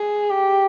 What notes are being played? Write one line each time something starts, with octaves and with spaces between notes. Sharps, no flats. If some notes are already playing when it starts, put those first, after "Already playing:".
Already playing: G#4
G4